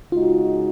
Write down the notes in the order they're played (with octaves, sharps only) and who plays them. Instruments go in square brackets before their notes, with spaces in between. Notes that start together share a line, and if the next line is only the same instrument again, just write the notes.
[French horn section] C#3 G#3 D#4 F#4 [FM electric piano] F4